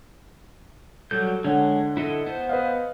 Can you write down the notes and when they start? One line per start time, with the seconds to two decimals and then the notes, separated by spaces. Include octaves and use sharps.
1.11 F#3 G3 A4 G6
1.44 D3 G#3 C#5 F#5
1.97 E4 A4 D#5
2.26 B3 C5
2.49 B4 D#5 F5